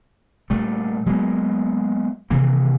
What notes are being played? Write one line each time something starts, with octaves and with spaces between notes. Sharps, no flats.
A#2 G3 A3
F#3 G#3 A#3 B3
C3 D#3 E3 A#3